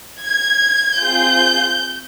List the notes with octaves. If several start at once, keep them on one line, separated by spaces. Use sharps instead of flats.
G#6
C4 F4 G#4 G6